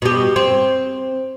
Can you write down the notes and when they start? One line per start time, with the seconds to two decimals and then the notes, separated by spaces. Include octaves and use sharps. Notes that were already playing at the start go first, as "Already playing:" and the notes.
0.02 B2 G4
0.36 C4